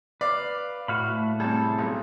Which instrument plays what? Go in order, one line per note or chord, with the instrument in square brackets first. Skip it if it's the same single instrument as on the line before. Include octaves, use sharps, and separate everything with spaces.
[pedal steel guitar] B4 F5 [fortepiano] D5
[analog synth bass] A2 [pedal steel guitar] F#4 F5 B5
[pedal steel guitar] A3
[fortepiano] C3 G3 [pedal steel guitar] G#4 A4 A5
[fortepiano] B1